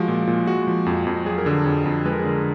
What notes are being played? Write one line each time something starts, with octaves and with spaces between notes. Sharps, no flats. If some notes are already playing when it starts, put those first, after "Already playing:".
Already playing: F3 G#3 F#4
A#2
A#2
G#3 F#4
F3
F2
F2
F#3 G#4
A#4
D3 G#4
F2
F2
G#3 B4
A#4
G#4
D3 A#4